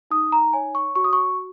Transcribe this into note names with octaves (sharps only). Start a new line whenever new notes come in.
D#4 D#6
A#5
C#5 G#5
C#6
F#4 C#6
D#6
C#6